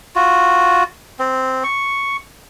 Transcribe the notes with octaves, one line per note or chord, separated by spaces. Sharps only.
F4 F#4
C4
C#6